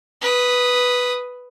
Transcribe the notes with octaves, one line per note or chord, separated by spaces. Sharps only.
B4 D#6